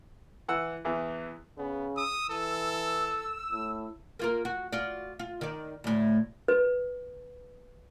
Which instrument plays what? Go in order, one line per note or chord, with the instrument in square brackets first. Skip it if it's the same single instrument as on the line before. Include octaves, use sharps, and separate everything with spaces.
[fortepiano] E3 F#5 E6 F#6
E2 E3
[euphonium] C#3 [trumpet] B3
[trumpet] D#6 [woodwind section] E6
[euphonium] E3 [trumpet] A4
[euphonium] A2
[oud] A#3 F4 A#4
F#4
F4 F#4 D5
F4
D#3 D5
D2 A2
[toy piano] B4